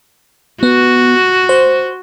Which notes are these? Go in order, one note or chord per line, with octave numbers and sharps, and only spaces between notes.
B3 F#4
C5